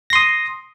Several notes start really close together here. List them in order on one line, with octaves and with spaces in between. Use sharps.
A#6 C6 D#6